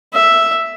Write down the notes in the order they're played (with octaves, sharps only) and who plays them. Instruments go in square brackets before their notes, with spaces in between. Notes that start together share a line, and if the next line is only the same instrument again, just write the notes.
[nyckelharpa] E5